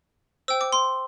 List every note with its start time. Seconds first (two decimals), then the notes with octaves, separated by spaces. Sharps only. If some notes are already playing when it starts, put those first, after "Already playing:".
0.48 C5 G5 E6
0.61 D6
0.72 C6